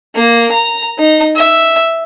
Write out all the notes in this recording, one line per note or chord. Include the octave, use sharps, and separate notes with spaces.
A#3
A#5
D#4
E5